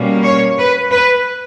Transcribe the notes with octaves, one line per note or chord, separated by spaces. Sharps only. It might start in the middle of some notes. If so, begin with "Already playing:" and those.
Already playing: B2 G3 A#3 C#4
C#5
B4
B4